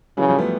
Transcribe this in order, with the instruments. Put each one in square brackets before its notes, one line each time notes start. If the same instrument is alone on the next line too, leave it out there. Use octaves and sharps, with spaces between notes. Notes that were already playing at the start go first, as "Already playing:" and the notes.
[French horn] C#3 [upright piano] E3 F#3
[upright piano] F3 G3
A3 B3